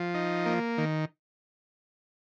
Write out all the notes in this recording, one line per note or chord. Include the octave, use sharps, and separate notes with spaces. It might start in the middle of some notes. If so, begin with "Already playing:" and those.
Already playing: F3
D#4
A#3
D#3